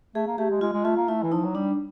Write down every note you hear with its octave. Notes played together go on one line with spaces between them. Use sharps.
A3 G#4
A#3
A3 G4
G#3
G#3 F4
G#3
A3 F4
A#3
A3 E4
E3
F3 D#4
F#3
G3 D4